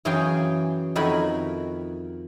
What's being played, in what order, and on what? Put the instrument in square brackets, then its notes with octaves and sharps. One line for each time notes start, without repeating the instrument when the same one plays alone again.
[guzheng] F#2 E3 G#4 C#5 F5 G5
F2 D#3 E4 F#4 A#4 B5